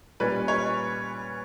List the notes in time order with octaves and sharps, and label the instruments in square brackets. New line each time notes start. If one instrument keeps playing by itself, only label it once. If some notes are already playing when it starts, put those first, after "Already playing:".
[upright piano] A#2 G3 C#4 B4
C#5